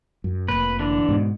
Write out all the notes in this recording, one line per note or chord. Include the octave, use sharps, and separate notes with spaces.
F#2
F1 A#2 B4
D3 E3 D4
G#2 B2